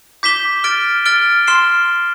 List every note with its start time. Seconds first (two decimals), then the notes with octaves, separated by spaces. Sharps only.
0.23 D6 G6 B6 E7 G7
0.64 F6 A6 D7 G7
1.05 F6 A6 D7 G7
1.47 C6 F6 C7 E7 G7